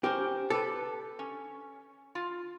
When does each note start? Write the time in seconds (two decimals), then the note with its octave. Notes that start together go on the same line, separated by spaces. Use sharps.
0.04 C#4 G4 A#4 C5
0.50 G4 A4 B4
1.19 C#4
2.15 F4